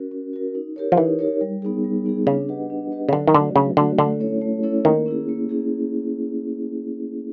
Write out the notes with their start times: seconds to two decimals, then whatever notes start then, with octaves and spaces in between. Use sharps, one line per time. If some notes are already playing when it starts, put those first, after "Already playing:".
Already playing: C#4 F#4 A#4
0.11 C#4
0.33 F#4 A#4
0.55 D#4
0.76 G4 A#4 C#5
0.92 F3
0.97 E3 D#4
1.19 G4 A#4 C#5
1.41 G3
1.62 B3 D#4 G#4
1.84 G3
2.05 B3 D#4 G#4
2.27 C#3 D4
2.49 G4 B4 D#5 F#5
2.70 D4
2.91 G4 B4 D#5 F#5
3.09 C#3
3.13 D3 F#3
3.27 D#3
3.34 D3 A3 D4 F#4
3.56 C#3 F#3
3.77 D3 A3 D4 F#4
3.98 D3 A3
4.20 C#4 E4 A4 C#5
4.41 A3
4.63 C#4 E4 A4 C#5
4.85 D#3 A#3
5.06 C#4 E4 G#4
5.29 A#3
5.49 C#4 E4 G#4